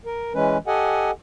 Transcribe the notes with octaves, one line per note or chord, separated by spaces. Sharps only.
A#4
E3 G#3 C#4 B4
G4 A4 D#5 F#5 G#5